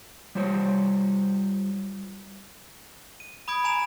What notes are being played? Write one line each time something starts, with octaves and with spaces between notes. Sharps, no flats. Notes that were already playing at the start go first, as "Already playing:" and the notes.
G3 F4 C5 C#5
D#7
B5 D#6 G#6 D7
G#5 A#5 D7 F7